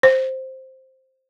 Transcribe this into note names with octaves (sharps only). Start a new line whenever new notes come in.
C5